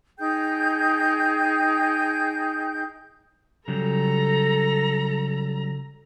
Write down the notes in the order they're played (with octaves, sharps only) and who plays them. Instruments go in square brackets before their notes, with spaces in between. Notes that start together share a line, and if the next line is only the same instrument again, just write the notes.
[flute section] D#4 G#4 G5 G6
[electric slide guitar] C#3 F#3 G3 [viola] A4 A#5